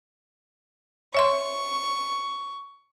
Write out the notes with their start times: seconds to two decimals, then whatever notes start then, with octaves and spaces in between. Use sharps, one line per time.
1.15 C#5 E5 C6 C#6